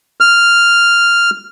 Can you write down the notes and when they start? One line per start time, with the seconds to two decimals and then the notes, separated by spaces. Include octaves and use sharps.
0.21 F6